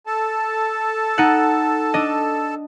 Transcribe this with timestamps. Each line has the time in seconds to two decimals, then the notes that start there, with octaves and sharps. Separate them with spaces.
0.07 A4 A5
1.18 D#4 F#5
1.94 D4 D#5